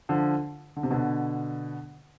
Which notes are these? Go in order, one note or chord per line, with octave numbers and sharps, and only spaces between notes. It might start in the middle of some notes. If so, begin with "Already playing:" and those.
D3 F3
D3
C3
B2 D3